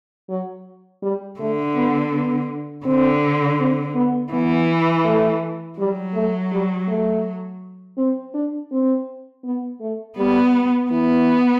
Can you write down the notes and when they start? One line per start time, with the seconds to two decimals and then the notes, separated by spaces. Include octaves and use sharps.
0.29 F#3
1.03 G3
1.40 D3 A3
1.76 B3
2.13 B3
2.85 D3 C4
3.60 C4
3.95 B3
4.32 E3 B3
5.05 A3
5.79 F#3 G3
6.15 A3
6.52 G3
6.88 A3
7.98 C4
8.34 D4
8.72 C4
9.44 B3
9.81 A3
10.18 G3 B3
10.91 E3 B3